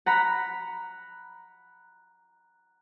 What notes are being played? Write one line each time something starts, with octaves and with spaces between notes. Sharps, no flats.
F#5 A#5 B5